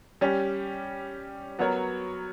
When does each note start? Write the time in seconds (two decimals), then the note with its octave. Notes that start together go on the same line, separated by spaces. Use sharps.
0.21 G3 C#4 G4
1.59 F#3 B3 F#4 A#4 C#5